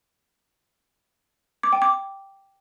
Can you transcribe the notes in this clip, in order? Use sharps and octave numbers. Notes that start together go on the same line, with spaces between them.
D6
G5
D6